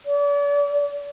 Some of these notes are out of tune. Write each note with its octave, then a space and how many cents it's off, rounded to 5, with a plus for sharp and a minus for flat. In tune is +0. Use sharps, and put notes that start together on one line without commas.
D5 -40